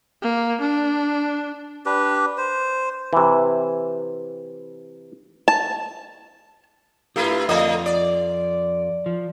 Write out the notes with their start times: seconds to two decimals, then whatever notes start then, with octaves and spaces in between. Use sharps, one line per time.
0.22 A#3
0.60 D4
1.86 D4 G4 B4
2.38 C5
3.13 C3 E3
5.48 A5
7.16 A3 E4 F4 G4 B4
7.49 F2 D3 A3 F4 D#5
7.86 D5
9.06 F3